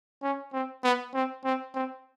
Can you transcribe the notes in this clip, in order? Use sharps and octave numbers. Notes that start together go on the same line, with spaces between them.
C#4
C4
B3
C4
C4
C4